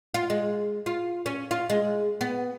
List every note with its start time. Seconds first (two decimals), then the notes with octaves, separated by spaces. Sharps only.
0.14 F4
0.30 G#3
0.86 F4
1.26 C#4
1.51 F4
1.70 G#3
2.21 B3